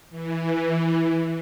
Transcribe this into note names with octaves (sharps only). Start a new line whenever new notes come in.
E3